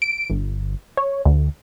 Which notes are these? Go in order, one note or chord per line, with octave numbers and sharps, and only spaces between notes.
D7
G1
C#5
D2